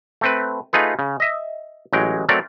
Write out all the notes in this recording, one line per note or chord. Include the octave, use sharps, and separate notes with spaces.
A3 C4 B4
A3 D#4 F4 G#4 B4
C#3
D#5 E5
A1 F#3 G#3 G5
F#3 A3 C4 A#4 D5